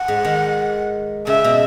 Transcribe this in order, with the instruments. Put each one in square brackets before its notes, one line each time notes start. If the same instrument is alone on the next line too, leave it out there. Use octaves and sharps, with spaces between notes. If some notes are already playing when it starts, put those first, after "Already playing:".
Already playing: [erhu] F#5
[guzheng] G#2
D#3
[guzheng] C#3 [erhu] E5
[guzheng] B2